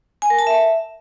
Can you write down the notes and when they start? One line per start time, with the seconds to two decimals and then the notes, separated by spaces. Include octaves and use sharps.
0.22 G#5
0.30 A#4
0.39 A5
0.47 E5